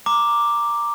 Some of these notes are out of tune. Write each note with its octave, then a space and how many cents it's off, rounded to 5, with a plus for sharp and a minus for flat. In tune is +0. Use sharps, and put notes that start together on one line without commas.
A#5 +0 D6 +0